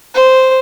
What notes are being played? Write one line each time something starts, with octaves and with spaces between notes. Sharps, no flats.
C5